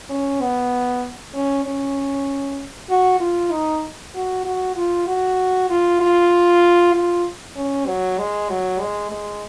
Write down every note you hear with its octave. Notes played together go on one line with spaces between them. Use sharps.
C#4
B3
C#4
C#4
F#4
F4
D#4
F#4
F#4
F4
F#4
F4
F4
F4
C#4
F#3
G#3
F#3
G#3
G#3